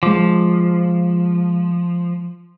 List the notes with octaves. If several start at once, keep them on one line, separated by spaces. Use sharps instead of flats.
F3 G#3 D6